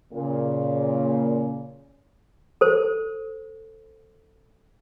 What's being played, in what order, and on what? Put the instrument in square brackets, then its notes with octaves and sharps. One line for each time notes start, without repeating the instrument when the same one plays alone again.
[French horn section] A#2 C#3
[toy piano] A4 C5